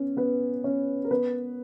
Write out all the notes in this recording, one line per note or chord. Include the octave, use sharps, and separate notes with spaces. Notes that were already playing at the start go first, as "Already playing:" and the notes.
Already playing: B3 C#4 C#5
B3 B4
C#4 C#5
A#4
B3 B4